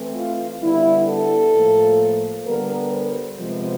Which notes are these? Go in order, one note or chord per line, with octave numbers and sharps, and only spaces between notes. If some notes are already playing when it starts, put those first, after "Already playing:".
Already playing: E3 A3 C4
F4
D3 G3 B3 E4
A4
A2 F3 A#3
D3 G3 B3 A#4
C5
C3 F3 G#3 B3